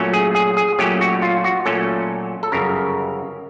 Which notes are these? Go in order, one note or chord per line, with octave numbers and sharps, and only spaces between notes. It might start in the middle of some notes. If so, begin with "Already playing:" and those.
Already playing: A#2 F#3 A3 C#4
G#4
G#4
G#4
A#2 F#3 A3 C#4 G4
F#4
F4
F#4
A#2 F#3 A3 C#4 A4
A4
G1 F#2 C#3 A#4